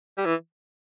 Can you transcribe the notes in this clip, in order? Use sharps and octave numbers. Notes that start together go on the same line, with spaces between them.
G3
E3